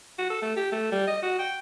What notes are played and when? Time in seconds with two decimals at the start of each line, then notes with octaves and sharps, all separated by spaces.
0.19 F#4
0.30 A4
0.42 A3
0.56 G4
0.72 A3
0.92 G3
1.07 D#5
1.22 F#4
1.39 G5